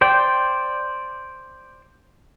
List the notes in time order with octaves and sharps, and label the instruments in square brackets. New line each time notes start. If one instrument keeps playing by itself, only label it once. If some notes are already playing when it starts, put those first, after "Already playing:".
[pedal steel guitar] C5 D5 G5